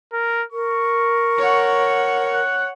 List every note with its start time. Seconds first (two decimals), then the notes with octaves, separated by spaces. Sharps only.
0.13 A#4
0.52 A#4 C#6
1.38 C#5 F#5
2.33 F#6